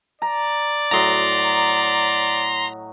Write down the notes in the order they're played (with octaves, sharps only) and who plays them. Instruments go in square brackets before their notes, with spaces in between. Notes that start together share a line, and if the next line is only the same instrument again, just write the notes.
[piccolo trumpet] D5 [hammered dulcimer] A#5
[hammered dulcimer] A2 F#3 D#5 [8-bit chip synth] A#5 C6